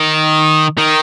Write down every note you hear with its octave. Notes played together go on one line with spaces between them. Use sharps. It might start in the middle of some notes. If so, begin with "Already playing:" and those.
Already playing: D#3
D#3